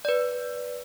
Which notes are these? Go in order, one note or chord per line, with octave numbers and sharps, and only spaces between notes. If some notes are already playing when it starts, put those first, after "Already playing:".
B4 D5